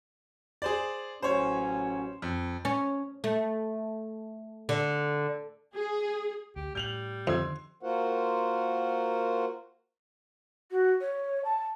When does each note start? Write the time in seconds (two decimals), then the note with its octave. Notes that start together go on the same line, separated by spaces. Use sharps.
0.62 G#4 C5 D5
1.22 A1 F#3 C#4 C5 C#5
2.22 F2
2.65 C#4
3.24 A3
4.69 D3
5.76 G#4
6.56 D2 G4
6.75 A2 G3 G6 F7 F#7
7.27 F2 D3 D#3 C6 E6 G#6
7.83 A#3 F4 F#4 A#4 C5 F#5
10.71 F#4
11.01 C#5
11.44 A5